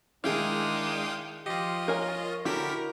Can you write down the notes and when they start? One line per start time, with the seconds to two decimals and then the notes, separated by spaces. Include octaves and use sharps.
0.24 D#3 G#3 D4 E4 G#4 F5 G5 D#6
1.46 F3 F4 G4 D#5
1.88 A#4 C#5 G#5
2.45 D3 E4 F#4 G4 A#4 B6